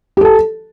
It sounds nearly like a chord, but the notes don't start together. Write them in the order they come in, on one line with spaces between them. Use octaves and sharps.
G4 A4 A5